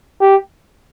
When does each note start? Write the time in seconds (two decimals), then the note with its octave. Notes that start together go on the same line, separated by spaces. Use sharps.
0.21 G4